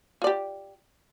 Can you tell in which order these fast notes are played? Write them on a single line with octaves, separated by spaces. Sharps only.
F4 D5 G4